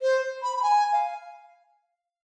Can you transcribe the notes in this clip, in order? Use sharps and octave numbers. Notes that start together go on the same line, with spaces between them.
C5
B5
B5
G#5
F5